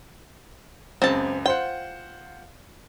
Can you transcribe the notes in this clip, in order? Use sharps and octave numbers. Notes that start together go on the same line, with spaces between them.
C#2 F#2 C4 A5
F4 C5 F#5 G5